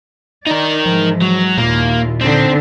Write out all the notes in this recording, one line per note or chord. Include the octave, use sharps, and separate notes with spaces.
D#4 A#4 D5
G#2 E3 F3 G#3
F#3
D#2 A#2 A#3 E4 F4
D3 C4 D4 D#4